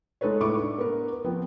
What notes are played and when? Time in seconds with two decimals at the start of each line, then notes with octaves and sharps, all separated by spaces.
0.21 G#3 D#4 A4 B4 C#5
0.40 A2 C#6 D6
0.59 D4
0.78 B3 A#4
1.24 F3 B3 C4